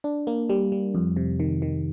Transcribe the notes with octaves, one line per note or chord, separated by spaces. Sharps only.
D4
A#3
G3
G3
F2
C3
D#3
D#3